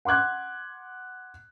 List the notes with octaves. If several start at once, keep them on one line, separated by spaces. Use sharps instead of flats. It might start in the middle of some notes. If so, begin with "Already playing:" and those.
F#5 C6 D6 F#6 G#6